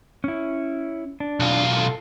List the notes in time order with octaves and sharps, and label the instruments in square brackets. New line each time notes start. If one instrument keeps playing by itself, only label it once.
[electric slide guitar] C#4 E4
D4
[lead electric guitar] B1 F4
[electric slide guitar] A4